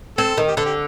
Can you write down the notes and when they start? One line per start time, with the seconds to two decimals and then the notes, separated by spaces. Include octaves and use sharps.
0.18 C4 A4
0.38 D#3
0.48 G4
0.57 D3 A4
0.65 G4